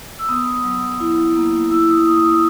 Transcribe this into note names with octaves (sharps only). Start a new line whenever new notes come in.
E6
B3 D#6
F#3
E4
A#3
E4 E6
D#6
A#3 D#6